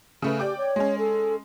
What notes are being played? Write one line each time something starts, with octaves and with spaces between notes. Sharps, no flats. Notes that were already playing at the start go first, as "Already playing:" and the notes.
C#3 A3 B4
G4 D5 G5 D6
C#5
G#3 C#4
A4